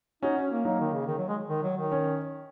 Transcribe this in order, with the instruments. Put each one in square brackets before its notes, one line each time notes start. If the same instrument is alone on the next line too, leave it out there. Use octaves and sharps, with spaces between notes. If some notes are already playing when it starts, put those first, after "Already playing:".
[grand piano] C#4 F#4 [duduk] D#4
[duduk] C#4
A#3
[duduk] F#3 [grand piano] A#3 D#4
[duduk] D#3
C#3
D#3
F#3
G#3
D#3
F#3
D#3
[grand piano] C#4